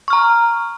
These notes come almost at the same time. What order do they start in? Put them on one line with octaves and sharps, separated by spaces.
C#6 F6 A#5